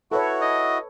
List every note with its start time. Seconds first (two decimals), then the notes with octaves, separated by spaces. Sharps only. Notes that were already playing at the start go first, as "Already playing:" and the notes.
0.12 E4 F#4 A4 B4 C#5
0.41 D#5